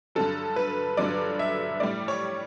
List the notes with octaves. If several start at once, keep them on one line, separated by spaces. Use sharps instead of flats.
G2 D3 F#3 A4
B4
G2 D3 F#3 D5
E5
A2 G3 D5
C#5